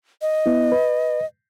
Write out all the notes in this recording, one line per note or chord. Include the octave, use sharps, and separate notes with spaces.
D#5
B3 E4
B4